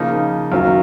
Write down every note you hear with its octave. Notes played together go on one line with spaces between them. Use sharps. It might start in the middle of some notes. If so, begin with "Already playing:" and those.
Already playing: C#3 F3 A#3 D#4
F#2 D#3 F#3 C#4 F4